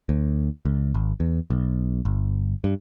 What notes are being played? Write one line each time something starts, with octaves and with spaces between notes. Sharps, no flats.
D2
C#2
G#1
E2
B1
G1
G2